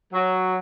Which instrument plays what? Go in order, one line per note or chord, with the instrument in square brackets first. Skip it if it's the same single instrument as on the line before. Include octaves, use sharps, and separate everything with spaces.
[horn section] F#3